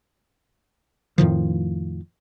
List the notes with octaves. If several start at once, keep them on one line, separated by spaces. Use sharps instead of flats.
F2 A2 D#3 F3